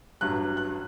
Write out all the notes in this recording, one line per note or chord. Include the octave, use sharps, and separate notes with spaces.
A1 G2 F#3 F#6
F#6